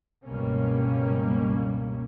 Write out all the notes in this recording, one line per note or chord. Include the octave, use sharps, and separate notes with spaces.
C#2 G2 B2 G3 A#3 C#4